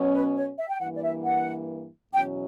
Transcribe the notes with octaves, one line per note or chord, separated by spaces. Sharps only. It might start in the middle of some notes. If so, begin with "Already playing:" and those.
Already playing: B2 F#3 C#4
B4
C#5
E5
G5
G2 E3 A#3 F#5
D5
E5
F#5
E2 B2 F#3 C#4 G5